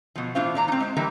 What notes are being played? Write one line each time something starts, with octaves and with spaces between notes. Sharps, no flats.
B2 F3
A2 E3 D4 F4 C5 F5
A#2 D5 A#5
C4 D#4
G#3 C5
D3 E3 G3 A#3 D4